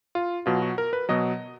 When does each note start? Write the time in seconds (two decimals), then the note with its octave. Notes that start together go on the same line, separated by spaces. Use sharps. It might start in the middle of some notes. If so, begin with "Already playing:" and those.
0.15 F4
0.46 B2 F#3 F4
0.62 F#4
0.78 A#4
0.93 B4
1.09 B2 F#3 D#5